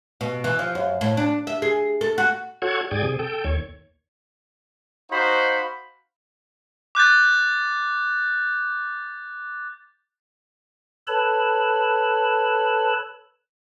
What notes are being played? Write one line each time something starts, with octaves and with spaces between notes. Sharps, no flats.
B2
E3
F3
F#2
A2
D4
E5
G#4
A4
F#4
F#4 A4 C#5 F#5 G#6
G#2 G#4 D5 G5 G#6
C3 G#4
A4 G5
D#2 C#5
D#4 F#4 C5 F5 B5
D6 F#6 G6 A6
A4 B4 C#5 A5 B5